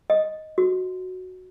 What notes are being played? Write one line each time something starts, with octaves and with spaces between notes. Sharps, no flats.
D#5
F#4